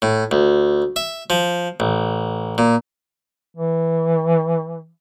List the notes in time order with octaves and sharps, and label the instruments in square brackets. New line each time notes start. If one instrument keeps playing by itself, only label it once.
[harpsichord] A2
D2
E5
F3
A1
A#2
[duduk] E3